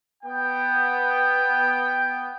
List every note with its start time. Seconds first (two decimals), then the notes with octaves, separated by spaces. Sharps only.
0.24 B3 G5